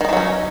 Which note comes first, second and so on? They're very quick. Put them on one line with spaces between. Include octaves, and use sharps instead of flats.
D#3 D#4 E3 F#3 C#4